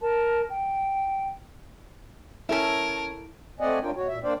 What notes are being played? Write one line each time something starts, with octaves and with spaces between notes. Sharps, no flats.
A#4 A5
G5
C#4 E4 A4 A#4 C#5 E5 A5
A3 C4 D5 D#5 F#5 G#5
F#2 C#4 D4 F4 A#4 G5
B2 F#4 C#5
A#2 E5
A#3 D4 C5 D5 F5 G5